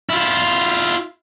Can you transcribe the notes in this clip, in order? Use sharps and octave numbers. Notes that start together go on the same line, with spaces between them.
E4 F4